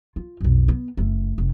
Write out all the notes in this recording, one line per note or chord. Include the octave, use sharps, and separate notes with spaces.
F4
B1 F2
B3
F#1 A3
F1